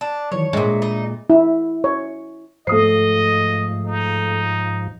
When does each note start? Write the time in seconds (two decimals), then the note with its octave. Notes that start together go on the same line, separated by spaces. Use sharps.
0.01 D4
0.32 D#3 E3 F#3 C#5
0.53 A#2 G#3 D4 D#5 E5
0.82 D#4
1.30 E4
1.84 C#5
2.67 G#2 F3 A3 D#5 D#6 C7
3.87 D#4